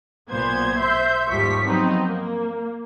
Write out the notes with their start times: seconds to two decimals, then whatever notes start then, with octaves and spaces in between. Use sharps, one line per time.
0.30 B1 A#2 B3 C5 G#6
0.79 C5 E5 C6 G6
1.30 D#2 G#2 F3 G3 C#6 B6
1.66 F3 F#3 B3 C4 D#4
2.07 A#3